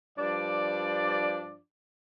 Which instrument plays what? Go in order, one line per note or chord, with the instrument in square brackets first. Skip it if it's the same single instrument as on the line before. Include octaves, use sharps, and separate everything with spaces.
[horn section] G2 F3 D4 D5